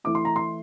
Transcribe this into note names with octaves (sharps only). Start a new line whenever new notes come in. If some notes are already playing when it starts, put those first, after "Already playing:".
E3 A3 E4 D6
C6
A#5
C6